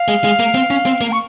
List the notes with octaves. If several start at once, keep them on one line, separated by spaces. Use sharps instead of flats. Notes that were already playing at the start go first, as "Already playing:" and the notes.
Already playing: F5
G#3
G#3
A#3
C4
C#4
C4
A#3
C#6